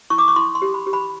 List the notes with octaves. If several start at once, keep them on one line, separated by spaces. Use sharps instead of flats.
E4 C#6
D6
C#6
E4 C6
C6
G4
B5
G4
B5